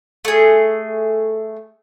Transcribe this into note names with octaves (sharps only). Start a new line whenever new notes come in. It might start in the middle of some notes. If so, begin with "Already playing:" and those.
A3 G#4